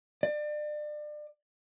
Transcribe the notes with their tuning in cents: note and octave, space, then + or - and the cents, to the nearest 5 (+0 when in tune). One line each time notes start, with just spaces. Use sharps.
D5 +30